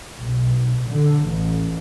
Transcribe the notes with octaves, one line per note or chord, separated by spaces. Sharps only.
B1
D3
A1